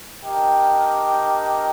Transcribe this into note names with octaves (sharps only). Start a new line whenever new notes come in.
D4 G4 A#4 D#5 G5